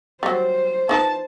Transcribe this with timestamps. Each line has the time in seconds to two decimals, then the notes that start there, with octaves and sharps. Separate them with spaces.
0.23 F#3 G3 C5
0.89 F3 D#4 B4 A5